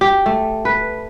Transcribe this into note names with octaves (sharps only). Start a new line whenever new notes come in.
G4
A3
B4